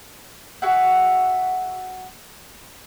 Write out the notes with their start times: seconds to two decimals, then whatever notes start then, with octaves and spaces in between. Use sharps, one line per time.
0.62 F#4 G#4 E5 F#5